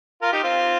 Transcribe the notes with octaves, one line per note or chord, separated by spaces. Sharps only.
F4 A#4
D#4 G4
C4 F4